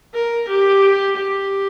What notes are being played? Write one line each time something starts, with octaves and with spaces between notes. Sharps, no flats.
A#4
G4
G4